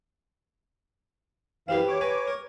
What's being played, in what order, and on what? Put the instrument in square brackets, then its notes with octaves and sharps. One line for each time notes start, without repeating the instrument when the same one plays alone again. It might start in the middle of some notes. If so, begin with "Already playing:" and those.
[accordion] F#2 E3 F5 [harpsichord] C4 G4 B4
[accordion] C#5 D6
[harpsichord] B4 G#5 A#5
A#4